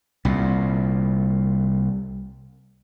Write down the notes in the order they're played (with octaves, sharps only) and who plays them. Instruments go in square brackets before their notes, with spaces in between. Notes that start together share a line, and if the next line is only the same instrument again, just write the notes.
[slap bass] C2 A#2